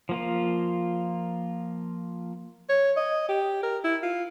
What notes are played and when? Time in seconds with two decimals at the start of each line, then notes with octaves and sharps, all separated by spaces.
0.09 F3 A#3 F4
2.69 C#5
2.97 D#5
3.29 G4
3.63 A#4
3.84 E4
4.03 F4